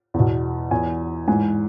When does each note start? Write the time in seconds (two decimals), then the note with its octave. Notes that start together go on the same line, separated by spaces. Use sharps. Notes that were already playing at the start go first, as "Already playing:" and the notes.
0.14 E2
0.19 B2
0.71 E2 E3 G#5
1.28 G#2 E3 G#5